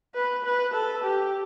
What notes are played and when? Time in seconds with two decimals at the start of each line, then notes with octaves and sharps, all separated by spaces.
0.15 B4
0.45 B4
0.74 A4
1.04 G4